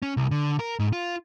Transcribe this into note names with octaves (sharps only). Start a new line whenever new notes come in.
C#4
C2
D3
A#4
G#2
F4